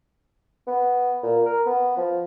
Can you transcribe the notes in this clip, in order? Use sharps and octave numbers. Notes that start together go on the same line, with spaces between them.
B3
A#2
A#4
B3
F3